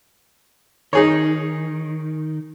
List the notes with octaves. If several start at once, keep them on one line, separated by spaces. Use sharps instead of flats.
D#3 D#4 G#4 C#5